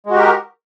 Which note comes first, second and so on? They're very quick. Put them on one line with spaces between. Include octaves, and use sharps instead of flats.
G#3 F#4 G4 A#4